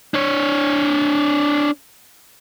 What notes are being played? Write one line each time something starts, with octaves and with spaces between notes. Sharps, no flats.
D4 C#5